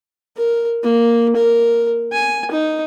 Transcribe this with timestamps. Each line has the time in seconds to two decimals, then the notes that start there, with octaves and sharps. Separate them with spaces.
0.37 A#4
0.83 A#3
1.36 A#4
2.13 G#5
2.52 D#4